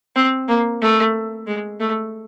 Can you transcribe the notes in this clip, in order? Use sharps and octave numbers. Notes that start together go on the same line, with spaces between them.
C4
A#3
A3
G#3
A3